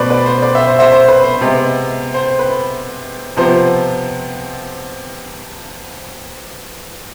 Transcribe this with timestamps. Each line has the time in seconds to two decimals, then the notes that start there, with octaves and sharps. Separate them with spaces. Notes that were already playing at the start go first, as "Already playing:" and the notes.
Already playing: B2 A3 B4 C5 D5
0.10 B4 D5
0.26 C5
0.42 B4 D5
0.55 C5 E5
0.67 C5
0.79 C5 E5
0.92 C5
1.08 B4
1.24 C5
1.41 C3 G#3 B3
2.14 C5
2.39 B4
3.37 C3 F3 B3 C5